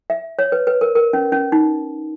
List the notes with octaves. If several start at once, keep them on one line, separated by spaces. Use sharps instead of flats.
E5
C#5
B4
B4
A#4
A#4
C#4
C#4
D#4